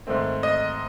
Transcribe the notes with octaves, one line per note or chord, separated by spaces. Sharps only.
G#2 D#3 A3 C4
D#5